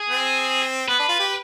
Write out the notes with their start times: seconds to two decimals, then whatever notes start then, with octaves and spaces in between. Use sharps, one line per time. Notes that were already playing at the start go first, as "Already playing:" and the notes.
Already playing: G#4
0.09 C4
0.88 B3 B4
0.99 D4
1.09 F4
1.19 G4